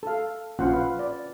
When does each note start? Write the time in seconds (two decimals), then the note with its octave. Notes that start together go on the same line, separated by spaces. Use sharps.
0.03 A4 F5
0.59 A#1 C#4 F4 C5 F5 F#5
0.73 B4 F5
0.99 D5